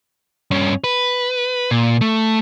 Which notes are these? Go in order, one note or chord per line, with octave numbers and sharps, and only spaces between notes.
G2 C#4
B4
A#2
A3